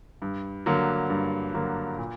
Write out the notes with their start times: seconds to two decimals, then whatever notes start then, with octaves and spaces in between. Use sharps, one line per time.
0.22 G2
0.66 D3 F#3 A#3
1.10 G2
1.54 D3 F#3 A#3
1.98 A#2